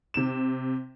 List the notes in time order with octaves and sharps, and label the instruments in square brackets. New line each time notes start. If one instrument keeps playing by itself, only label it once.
[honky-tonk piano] C3 E7